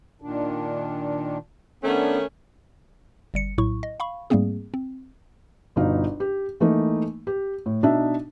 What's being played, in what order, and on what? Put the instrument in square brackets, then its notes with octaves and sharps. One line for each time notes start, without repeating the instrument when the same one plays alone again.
[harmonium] A#2 D#3 D4
[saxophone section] D#3 A3 C#4 [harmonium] B3 D4
[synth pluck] G1 G3 C#7
A#1 A2 F#3 E4 C#6
D#5
F5 B5 C#6
G#2 G3 A3 A#3 C4 G#4
C4
[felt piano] G1 B2 D#4 F5
G4
E3 A3 A#3 D#4
G4
A2
B2 D4 D#4 E5